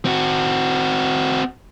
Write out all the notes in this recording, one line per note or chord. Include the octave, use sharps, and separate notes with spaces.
C4 F#4